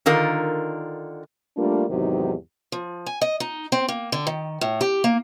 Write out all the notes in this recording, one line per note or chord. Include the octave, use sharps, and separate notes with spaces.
D3 D#3 F4 A#4
G3 A3 A#3 D4 F4 A#4
E2 G#2 C3 D#3 F#3 G4
F3
G#5
D#5
D#4
C4
A#3
D3
D#3
A2
G4
A#3